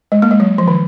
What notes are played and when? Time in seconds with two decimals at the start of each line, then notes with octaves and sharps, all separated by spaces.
0.12 G#3
0.22 A#3
0.31 G#3
0.40 F#3
0.58 F3
0.68 D#3